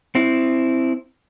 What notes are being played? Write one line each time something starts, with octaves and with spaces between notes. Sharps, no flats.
C4 E4